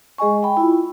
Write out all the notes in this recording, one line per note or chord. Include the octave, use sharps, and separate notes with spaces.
G#3 G#4 D#5 G#5 C#6
G5 B5
E4 F4